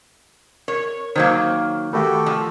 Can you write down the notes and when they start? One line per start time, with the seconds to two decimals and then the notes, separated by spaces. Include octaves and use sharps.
0.68 A#4 C#5
1.16 D#3 F#3 A#3 C5
1.93 D#3 A3 F#4 G4 A4
2.26 F3